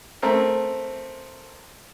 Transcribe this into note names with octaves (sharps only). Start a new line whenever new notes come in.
A3 C4 A#4